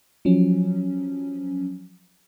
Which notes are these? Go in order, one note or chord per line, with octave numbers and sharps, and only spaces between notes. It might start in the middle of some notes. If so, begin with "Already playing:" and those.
F3 F#3 C#4